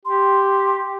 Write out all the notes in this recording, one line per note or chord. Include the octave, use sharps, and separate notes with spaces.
G4 C6